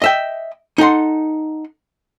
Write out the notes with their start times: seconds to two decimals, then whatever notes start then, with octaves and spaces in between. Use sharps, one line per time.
0.02 D#5 E5 G5
0.78 D#4 A4 F#5 C6